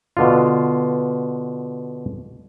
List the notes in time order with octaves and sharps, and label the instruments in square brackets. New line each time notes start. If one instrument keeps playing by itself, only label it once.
[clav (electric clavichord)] B2 D3 F4